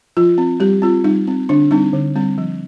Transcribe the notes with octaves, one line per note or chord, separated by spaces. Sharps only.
F3 F4
C4
G3 G4
C4 F4
G3 D#4
C4
D3 D4
G3 C4 D#4
D3
G3 C4
F3